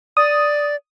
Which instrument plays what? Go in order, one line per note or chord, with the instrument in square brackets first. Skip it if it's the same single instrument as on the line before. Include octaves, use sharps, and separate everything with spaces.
[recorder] D5 [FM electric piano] D#6